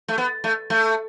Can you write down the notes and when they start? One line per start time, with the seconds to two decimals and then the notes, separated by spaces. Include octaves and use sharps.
0.08 A3
0.18 B3
0.44 A3
0.70 A3